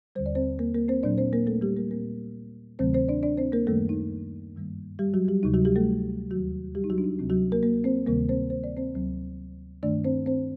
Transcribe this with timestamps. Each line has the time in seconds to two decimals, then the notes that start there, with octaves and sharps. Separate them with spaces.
0.15 D#2 D3 G3 C5
0.26 D5
0.35 C4 C5
0.59 A#3 A#4
0.75 A#3 A#4
0.89 C4 C5
1.03 A#2 F#3 C4 D4 D5
1.18 C4 C5
1.33 A#3 A#4
1.47 A3 A4
1.61 G3 G4
1.76 A#3 A#4
1.91 A#2 G3 A#3 C4 A#4
2.79 D2 C3 D#3 F#3 A3 C4 C5
2.94 C4 C5
3.08 D4 D5
3.23 D4 D5
3.37 C4 C5
3.52 A#3 A#4
3.67 F#2 D#3 G3 A3 A#3 A4
3.89 D#4
4.55 G2 D#3 G3 A#3
4.99 G3 G4
5.14 F#3 F#4
5.28 G3 G4
5.43 D2 C3 F#3 D#4
5.54 F#3 F#4
5.65 G3 G4
5.76 A3 A4
6.31 D#2 D#3 F#3 F#4
6.75 G3 G4
6.84 D#4
6.90 F#3 F#4
6.98 D4
7.04 D#4
7.19 D2 C3 F#3 C4
7.30 F#3 F#4
7.52 A#3 A#4
7.63 A#3 A#4
7.84 C4 C5
8.06 D2 C3 D#3 G3 A#3 A#4
8.29 C4 C5
8.50 C5
8.64 D5
8.77 C4 C5
8.95 D2 C3 F#3 C4
9.83 G2 D#3 A3 D4 D5
10.04 C4 C5
10.26 C4 C5